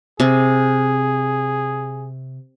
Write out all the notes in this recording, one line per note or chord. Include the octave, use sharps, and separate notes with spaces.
C3 G#4